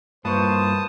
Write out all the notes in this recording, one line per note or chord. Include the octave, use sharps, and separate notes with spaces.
G2 A#3 F4 B4 C5 A5 C#6 D#6